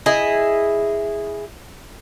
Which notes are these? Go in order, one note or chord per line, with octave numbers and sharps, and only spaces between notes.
E4 G#4 D#5